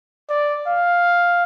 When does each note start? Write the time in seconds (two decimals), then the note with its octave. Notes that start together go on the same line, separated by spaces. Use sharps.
0.29 D5
0.67 F5